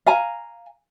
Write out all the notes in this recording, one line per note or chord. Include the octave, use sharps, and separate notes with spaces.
F5 G#5 A#5